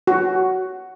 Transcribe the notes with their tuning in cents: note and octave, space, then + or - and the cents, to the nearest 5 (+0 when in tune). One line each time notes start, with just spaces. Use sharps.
F#4 +10